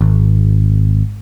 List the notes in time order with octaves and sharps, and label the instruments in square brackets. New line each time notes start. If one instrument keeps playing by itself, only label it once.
[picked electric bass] G#1